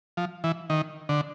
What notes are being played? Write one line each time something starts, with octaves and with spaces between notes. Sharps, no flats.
F3
E3
D#3
D3